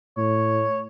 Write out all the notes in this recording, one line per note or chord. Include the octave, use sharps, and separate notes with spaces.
A2 C#5